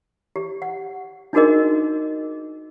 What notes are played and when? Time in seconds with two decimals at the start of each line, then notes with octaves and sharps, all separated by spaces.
0.36 G4
0.62 F#5
1.33 D4 D#4 F#4 G#4 A#4 D#5